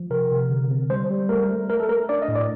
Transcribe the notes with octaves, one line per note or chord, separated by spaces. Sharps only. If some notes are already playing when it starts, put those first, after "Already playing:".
Already playing: F3
C3 A#4
C3
D3
C4
G3 C5
G3
A3 A#4
A3
A3 A#4
A4
A3 A#4
D4 D5
D#5
A2
D5